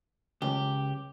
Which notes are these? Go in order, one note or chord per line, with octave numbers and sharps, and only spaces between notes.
C#2 G4